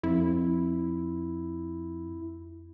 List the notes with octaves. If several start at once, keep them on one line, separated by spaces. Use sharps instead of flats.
F2 E4